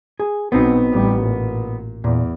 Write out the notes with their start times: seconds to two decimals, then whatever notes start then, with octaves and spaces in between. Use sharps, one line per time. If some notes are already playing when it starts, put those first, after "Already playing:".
0.20 G#4
0.52 B1 B2 B3 C4 D#4
0.91 A1 G3
1.22 A#2
2.04 E2 A#2